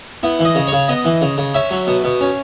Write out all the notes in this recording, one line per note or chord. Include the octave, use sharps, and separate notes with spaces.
B3 E4
E3
D#5
C#3
C#5
C#3
B3 D#5
E3
C#3
C#3
C#4 E5
F#3
B2
B2
C#4